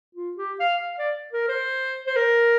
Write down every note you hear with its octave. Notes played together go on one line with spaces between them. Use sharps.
F4
G4
F5
F5
D5
A#4
C5
C5
A#4